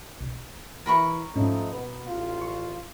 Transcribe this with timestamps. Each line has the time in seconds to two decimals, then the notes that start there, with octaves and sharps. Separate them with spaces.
0.21 B1
0.86 E3 E4 A#4 B5 C#6
1.36 G#2 F3 A3 C#4 D#4
1.73 B2 B3 B4
2.06 A1 F4
2.42 C#6